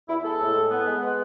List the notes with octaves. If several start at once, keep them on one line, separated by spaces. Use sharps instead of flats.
E2 E4
G#3 A4
A2
G#3
B3
G#3
B3